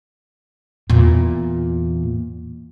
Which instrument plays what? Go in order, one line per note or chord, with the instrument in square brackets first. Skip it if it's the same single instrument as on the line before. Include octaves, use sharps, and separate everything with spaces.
[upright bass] E2 A#2